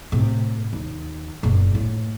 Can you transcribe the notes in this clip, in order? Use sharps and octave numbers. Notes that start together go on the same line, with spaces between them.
A2 C3
D#2
F#1 A#2
A2